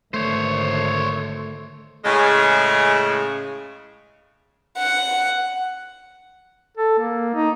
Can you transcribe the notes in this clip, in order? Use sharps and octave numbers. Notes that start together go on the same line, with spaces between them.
G#1 D3 A3 C5 C#5
A2 C#3 G#3
F#5
A4
A#3
D#4